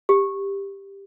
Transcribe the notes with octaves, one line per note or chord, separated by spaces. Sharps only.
G4